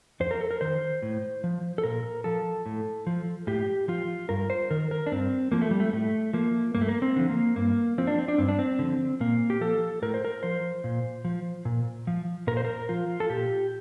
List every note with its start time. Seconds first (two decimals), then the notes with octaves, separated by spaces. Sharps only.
0.20 F2 C5
0.31 A#4
0.41 A4
0.51 A#4
0.61 D#3 C5
1.02 A2
1.44 F3
1.78 A4
1.84 A#2 A#4
2.24 F3 A4
2.66 A2
3.07 F3
3.47 A2 G4
3.88 F3 F4
4.29 G2 A#4
4.50 C5
4.71 D#3 A#4
4.91 A#4
5.06 D4
5.12 G2 C4
5.52 F3 A#3
5.62 A3
5.71 G3
5.80 A3
5.93 A2 A3
6.33 F3 A#3
6.75 G2 A#3
6.81 A3
6.88 A#3
7.02 C4
7.16 D3 F3
7.29 A#3
7.56 G2 A#3
7.98 F3 C4
8.07 D4
8.19 C4
8.28 D4
8.38 G2 C4
8.49 D4
8.59 C4
8.79 D3 F3
9.20 A#2 A#3
9.50 G4
9.61 F3 A4
10.02 A2 A#4
10.14 C5
10.25 A#4
10.43 F3 C5
10.84 A#2
11.25 F3
11.65 A#2
12.07 F3
12.47 A#2 A#4
12.57 C5
12.65 A#4
12.89 F3 F4
13.20 A4
13.30 A#2 G4